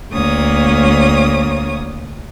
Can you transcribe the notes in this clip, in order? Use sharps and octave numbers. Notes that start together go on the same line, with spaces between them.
D2 A#3 C#5 D#6